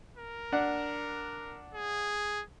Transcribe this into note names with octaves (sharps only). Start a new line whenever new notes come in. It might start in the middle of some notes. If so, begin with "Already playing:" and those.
A#4
D4 F#5
G#4